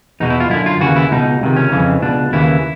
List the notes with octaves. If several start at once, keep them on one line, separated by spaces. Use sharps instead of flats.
E2 B2 D#4
E4
F4
F#2 D3 E4
F4
D#2 C#3 E3 F#4
E4
C#2 B2 D#4
C#2 C3 D#3
C#4
F2 C#3 E3
C#2 B2 D4
D#2 C#3 E3 E4